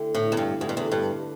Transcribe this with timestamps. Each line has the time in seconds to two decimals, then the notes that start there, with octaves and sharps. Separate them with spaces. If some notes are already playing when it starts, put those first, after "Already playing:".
Already playing: D3 A3 E4 G4
0.15 A2
0.32 E2
0.37 G2
0.60 E2 D3 A3 E4 G4
0.69 G2
0.77 E2
0.92 G2